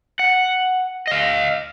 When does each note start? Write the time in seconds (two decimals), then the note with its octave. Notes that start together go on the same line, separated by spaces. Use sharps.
0.19 F#5
1.07 D#5 F5